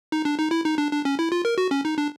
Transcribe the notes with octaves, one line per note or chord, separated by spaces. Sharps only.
D#4
D4
D#4
E4
D#4
D4
D4
C#4
E4
F4
A#4
F#4
C#4
D#4
D4